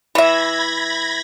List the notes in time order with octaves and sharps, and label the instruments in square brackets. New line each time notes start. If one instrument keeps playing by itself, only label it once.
[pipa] E3 E5 [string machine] B5 G#6 A#6